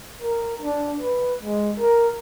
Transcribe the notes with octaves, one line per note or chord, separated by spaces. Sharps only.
A#4
D4
B4
G#3
A#4